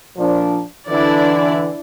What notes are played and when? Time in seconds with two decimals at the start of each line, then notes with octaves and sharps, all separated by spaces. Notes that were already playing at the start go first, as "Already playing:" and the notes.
0.17 A#2 F3 D4
0.89 D3 E3 D4 E4 D5